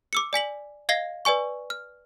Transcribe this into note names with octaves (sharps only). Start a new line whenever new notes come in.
D6 E6 C#7
D5 G#5 B6 F#7
D#5 F5 G#6 A#6 C7 G7
B4 D5 G#5 C#6
F6